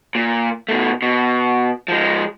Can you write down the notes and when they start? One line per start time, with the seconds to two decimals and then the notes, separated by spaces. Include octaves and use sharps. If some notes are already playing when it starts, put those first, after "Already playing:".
0.15 A#2
0.69 B2 A3
1.02 B2
1.88 F3 G#3